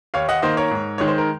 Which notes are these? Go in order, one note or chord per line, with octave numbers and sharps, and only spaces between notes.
D#2 C#5 F5
D#5 F#5
D#3 A#3 C5 D#5
A#4 C#5
G#2
D#3 G#3 C#5
C5
A#4